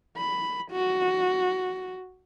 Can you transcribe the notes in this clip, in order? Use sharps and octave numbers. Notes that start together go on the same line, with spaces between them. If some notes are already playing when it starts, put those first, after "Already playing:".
B5
F#4